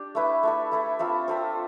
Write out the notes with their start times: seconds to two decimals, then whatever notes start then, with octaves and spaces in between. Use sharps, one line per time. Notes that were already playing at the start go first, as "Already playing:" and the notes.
Already playing: D4 G4
0.15 A3 E4 B4 E5
0.43 A3 E4 A4
0.72 A3 E4 A4
0.99 C4 F4 A4 E5
1.28 C4 F4 A4 E5